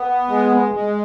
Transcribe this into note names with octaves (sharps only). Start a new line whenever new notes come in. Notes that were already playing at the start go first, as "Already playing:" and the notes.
Already playing: B3
G#3
G#3